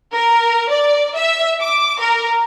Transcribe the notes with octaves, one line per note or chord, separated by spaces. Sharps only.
A#4
D5
E5
D6
A#4